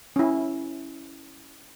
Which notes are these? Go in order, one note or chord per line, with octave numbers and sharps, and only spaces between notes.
C#4 E4